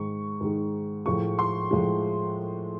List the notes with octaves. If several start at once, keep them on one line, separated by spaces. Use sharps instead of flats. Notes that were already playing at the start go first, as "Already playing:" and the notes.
Already playing: G#2 D#3 G#3 C#6
G#2 D#3 G#3
A2 F3 G#3 C#6
C6
A2 F3 G#3